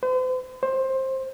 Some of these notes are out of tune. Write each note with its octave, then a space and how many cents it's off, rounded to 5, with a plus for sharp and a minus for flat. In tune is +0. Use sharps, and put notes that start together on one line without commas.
C5 -45
C5 +15